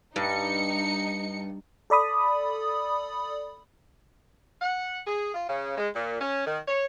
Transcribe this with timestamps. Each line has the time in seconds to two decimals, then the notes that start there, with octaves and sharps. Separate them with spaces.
0.16 G2 D#4 C#7
1.90 A4 D5 B5 D#6
4.61 F#5
5.06 G#4
5.34 F4
5.49 C#3
5.77 G#3
5.95 A#2
6.20 C#4
6.45 D#3
6.67 C#5